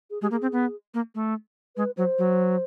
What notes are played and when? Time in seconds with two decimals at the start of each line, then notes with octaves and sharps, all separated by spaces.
0.11 G#4
0.22 G#3 G4
0.31 A#3 G#4
0.42 C4
0.53 B3
0.94 A#3
1.15 A3
1.76 G#3 B4
1.97 F#3 C5
2.18 F#3